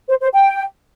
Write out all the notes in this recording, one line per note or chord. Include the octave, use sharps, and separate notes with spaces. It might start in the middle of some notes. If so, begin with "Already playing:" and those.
C5
C5
G5